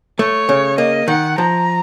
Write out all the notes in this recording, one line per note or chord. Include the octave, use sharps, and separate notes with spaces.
A3 C#5
C#3
A#3 D#5
D#3 F#5
F3 A#5